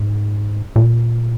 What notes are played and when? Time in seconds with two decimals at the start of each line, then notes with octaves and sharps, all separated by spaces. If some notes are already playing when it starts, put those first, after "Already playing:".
Already playing: G#2
0.76 A#2